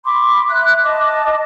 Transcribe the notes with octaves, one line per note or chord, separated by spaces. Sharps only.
B5 C6 D6
E5 F#6
D#5 A5 D6